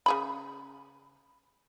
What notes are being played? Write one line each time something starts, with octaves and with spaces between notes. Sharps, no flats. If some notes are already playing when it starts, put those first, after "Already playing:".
C#3 G#4 B5